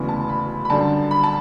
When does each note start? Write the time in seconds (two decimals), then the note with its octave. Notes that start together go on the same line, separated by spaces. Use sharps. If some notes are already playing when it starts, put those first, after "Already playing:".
Already playing: E1 D2 C#3 E3 B3 B5
0.09 A5
0.29 B5
0.65 B5
0.70 F#2 D3 G3 D4 A5
1.11 B5
1.24 A5